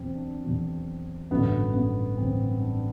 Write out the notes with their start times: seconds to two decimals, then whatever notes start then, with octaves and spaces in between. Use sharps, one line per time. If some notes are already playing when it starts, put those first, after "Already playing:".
Already playing: E2 B2 F#3 C4
0.15 D4
0.44 E2 B2 F#3
1.31 A1 G2 D3 F#3 B3
1.74 B3
2.17 A1 G2 D3 F#3 C4
2.61 D4